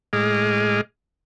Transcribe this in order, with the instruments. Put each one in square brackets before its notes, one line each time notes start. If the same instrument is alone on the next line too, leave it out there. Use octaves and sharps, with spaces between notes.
[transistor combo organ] A2 G#3 G#4 D#5 D6 F6